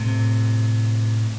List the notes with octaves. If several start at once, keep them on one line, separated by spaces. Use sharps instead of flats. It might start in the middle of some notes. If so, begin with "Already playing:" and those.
Already playing: A2 C3